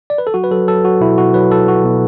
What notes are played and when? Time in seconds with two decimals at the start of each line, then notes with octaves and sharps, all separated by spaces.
0.10 D5
0.18 B4
0.27 A4
0.34 F#3 F#4
0.44 B4
0.51 F#3 A4
0.68 F#3 A4
0.85 F#3 F#4
1.01 B2 E4
1.18 B2 F#4
1.34 F#3 B4
1.51 F#3 A4
1.67 F#3 F#4
1.84 B2